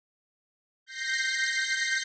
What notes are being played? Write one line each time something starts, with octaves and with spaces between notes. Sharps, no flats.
G6 A#6 C7